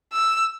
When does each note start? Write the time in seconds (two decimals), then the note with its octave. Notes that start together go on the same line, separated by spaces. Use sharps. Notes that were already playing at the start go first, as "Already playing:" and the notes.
0.13 E6